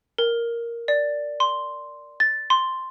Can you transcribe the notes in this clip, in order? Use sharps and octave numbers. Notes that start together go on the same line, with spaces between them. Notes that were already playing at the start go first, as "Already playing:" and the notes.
A#4
D5
C6
A6
C6